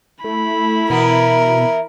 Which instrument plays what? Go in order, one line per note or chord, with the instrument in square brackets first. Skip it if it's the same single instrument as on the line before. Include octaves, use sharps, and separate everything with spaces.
[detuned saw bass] A3 [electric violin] E4 B5
[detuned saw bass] B2 [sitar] E3 B3 [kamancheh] A#4